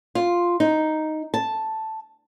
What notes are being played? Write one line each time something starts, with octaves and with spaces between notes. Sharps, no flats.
F4
D#4
A5